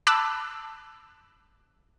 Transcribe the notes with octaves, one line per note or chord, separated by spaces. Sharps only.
A5 B5 D6 E6 F#6